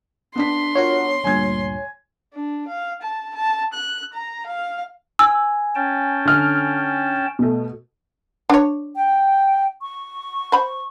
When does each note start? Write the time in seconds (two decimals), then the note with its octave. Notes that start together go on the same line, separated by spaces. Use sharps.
0.36 B3 D4 C6 B6
0.75 F4 F#4 A#4 C#5
1.24 D2 G2 A#2 G#5 G#6
2.34 D4
2.68 F5
3.02 A5
3.36 A5
3.74 F#6
4.13 A#5
4.47 F5
5.19 G#5 E6
5.75 C#4 G5 A5
6.25 D3 F6
7.39 B2 A3
8.50 D4 C#5
8.96 G5
9.82 C#6
10.52 C5 B5